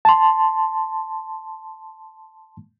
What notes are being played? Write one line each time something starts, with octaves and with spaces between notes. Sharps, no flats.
A5 C6